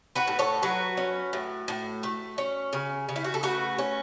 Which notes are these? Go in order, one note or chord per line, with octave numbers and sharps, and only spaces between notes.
F#4 B4
A2
A4 C#5
F#3 F#4 B4
C#4
A2
A2
A3
C#4
C#3
C#3
E4
F#4
A4
A3 F#4 B4
C#4